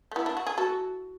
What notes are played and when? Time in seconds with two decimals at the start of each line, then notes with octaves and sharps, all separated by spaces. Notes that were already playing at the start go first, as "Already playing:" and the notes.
0.11 A3
0.16 B3 E4
0.26 D4
0.37 F#4
0.46 G#4
0.57 F#4 A4